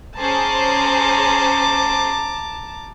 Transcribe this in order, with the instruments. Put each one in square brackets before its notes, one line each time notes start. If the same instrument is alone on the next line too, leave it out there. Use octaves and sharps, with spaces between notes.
[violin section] C#4 G#4 C5 [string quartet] A5 A#5 D6